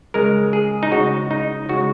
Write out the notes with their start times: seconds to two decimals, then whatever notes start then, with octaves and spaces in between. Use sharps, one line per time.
0.14 C#3 G#3 A#4
0.53 G#4
0.83 D#4
0.92 C#3 G#3 F#4
1.31 D#4
1.69 C#3 G#3 F#4